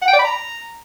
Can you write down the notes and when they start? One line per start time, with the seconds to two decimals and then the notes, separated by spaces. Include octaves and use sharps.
0.02 F#5
0.07 G5
0.13 D5
0.19 B5
0.24 A#5